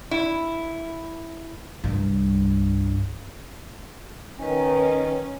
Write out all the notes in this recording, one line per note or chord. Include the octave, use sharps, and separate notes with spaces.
E4
C2 G2
D#3 C#4 B4 G#5